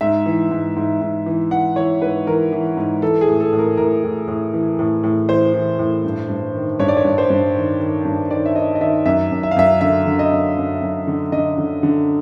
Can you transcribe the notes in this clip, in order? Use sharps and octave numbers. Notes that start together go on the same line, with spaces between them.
G#2 E5
E3
G#2
G#2
G#2
E3
E3 F#5
E3 C#5
G#2 B4
E3 A#4
E3
G#2
E3 A4
G#4
A2
A4
A2
A#4
A2 A#4
A2
A2
E3
A2
A2
E3 C5
E3
A2
G2
G2
D#3
G2 C#5
D5
C#5
G2
C5
G2
D#3
D#3
G2
D#3 D5
E5
D#3 D#5
D#5
D#3 E5
F#2 E5
F#2
E5
F5
F#2 E5
D3 E5
D3
D#5
F#2
F#2
F#2
D3
D3 D#5
D3
D3